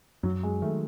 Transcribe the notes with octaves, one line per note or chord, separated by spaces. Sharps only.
F#2 F#3
G#3
D#3 A3